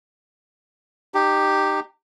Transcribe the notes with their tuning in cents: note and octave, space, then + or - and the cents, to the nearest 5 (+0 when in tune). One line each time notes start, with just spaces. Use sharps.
D#4 -30 G4 +0